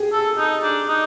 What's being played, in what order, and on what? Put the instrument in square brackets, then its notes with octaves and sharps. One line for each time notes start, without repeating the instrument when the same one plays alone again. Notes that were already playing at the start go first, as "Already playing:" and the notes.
Already playing: [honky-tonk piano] G4 G#4
[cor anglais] A4
D#4
D4
D#4